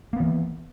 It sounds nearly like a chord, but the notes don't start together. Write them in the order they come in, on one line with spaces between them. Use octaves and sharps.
A#3 B3 D#3 E3